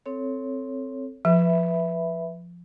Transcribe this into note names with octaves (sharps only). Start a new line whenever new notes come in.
C4 A4 C#5
F3 B4 E5 B5